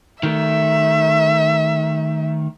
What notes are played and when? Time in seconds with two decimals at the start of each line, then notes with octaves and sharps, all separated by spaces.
0.23 D#3 A3 E5